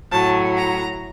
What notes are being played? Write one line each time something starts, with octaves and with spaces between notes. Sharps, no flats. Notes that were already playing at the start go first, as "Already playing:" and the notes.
A2 F#3 A5
A#5